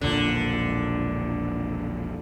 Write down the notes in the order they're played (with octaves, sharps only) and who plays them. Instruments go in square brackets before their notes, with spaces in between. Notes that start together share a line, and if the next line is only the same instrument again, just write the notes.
[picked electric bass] E1 A#1 A#2 [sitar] D3